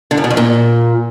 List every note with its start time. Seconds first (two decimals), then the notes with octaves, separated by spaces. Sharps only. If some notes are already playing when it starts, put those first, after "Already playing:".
0.11 D3
0.17 F#2
0.24 B2
0.30 F2
0.37 A#2